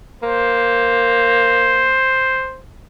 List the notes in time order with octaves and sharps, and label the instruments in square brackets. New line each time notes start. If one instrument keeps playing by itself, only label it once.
[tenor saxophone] A#3 [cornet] C5